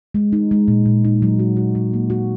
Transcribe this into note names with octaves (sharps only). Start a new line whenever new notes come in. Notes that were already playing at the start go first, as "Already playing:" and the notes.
G#3
D#4
G#3
A#2
A#2
D#4
F#3
F#4
F#4
F#3
A#3
F#4